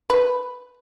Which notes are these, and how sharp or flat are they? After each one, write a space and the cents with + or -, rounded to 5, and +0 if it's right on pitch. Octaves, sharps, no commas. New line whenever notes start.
B4 +5